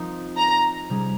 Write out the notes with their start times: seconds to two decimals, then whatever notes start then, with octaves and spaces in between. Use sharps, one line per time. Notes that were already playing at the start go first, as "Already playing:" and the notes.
Already playing: F3 C4 D#4 A#4
0.37 A#5
0.90 C3 G3 C#4 G#4